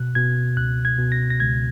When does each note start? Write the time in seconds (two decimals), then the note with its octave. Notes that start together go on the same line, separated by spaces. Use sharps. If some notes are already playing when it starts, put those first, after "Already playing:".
Already playing: B2 F#6
0.15 B2 G#6
0.57 C#2 F#6
0.85 G#6
0.98 B2
1.12 A#6
1.30 A#6
1.40 C#2 G#6